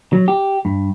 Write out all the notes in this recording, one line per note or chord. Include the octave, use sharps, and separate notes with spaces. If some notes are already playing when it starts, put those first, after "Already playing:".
F#3
G4
G2